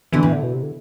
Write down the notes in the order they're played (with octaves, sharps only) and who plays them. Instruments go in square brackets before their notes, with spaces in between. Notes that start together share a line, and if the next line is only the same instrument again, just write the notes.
[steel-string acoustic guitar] B2 D3 [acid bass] E3
[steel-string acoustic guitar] A2
[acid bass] D3
B2
C3
D3